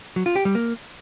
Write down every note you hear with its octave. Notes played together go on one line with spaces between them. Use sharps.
F#3
F4
G4
G3
A#3